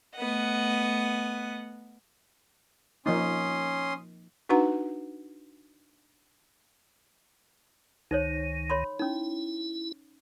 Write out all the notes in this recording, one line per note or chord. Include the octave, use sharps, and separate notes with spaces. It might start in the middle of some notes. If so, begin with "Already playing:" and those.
A3 B3 D#5 F#5
F3 A#3 C#4 D#4 C6 D#6
D4 D#4 F#4 B4 F#5 A#5
C#2 D#3 D#4 C5 C#5
C#5 B5 C6
C#4 D#4 E4